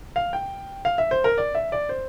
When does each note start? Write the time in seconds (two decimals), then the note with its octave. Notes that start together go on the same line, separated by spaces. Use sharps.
0.16 F5
0.33 G5
0.85 F5
0.98 E5
1.11 C5
1.24 A#4
1.38 D5
1.55 E5
1.72 D5
1.89 C5